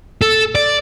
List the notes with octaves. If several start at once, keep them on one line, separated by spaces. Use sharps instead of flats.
A4
D5